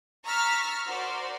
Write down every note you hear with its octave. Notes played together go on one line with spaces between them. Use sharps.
A#5 C#6 E6 F6 A6 B6
F#4 A#4 C5 D5